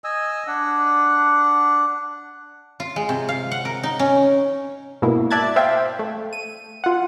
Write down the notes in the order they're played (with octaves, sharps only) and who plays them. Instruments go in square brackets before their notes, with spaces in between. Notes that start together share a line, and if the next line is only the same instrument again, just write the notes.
[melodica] D#5 G#5 E6
D4 F#5
[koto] F4
G#3
C3
F5
F#5
A#4
D#4
C#4
[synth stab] G#2 B2 A#3 E4
D5 E5 A5 F#6 G#6 A6
C5 E5 F5 G5
A3
D#7
F4 F#5